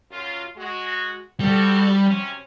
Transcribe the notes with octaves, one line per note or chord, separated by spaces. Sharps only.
F#2 F4
G#3 F#4
G3 C4 F#4 A4
F#2 C3 C#4